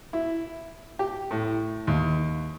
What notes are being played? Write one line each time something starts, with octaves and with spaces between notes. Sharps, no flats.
E4
G4
A2
D#2